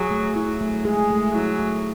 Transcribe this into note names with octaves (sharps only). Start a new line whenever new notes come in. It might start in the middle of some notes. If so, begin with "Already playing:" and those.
Already playing: F#3 G#4
A3
F#3 E4
A3
G#3 G#4
A3
F#3 E4
A3